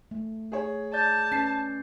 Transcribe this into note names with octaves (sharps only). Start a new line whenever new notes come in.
A3
G#4 C#5
D5 A5 G6 A6
C#4 B4 C7